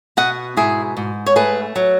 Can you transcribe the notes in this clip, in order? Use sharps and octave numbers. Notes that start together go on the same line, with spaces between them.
B2 D#5 F#5
G#2 E4 G#4
G#2
C#5
A3 G#4 B4
F#3